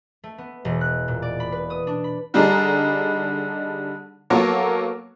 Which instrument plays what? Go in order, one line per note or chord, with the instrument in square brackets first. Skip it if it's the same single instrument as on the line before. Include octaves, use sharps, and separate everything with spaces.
[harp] A3
B3
E1
F#6
A#2
D5
B5
B4
D#6
D4
B5
[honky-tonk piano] D3 G3 D4 D#4 G#4 A#5
F#3 A#3 B3 A4 A#4 C#5